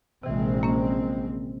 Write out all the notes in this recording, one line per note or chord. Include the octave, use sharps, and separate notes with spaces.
A#1 C3 E3 G#3 C4
A#3 C#4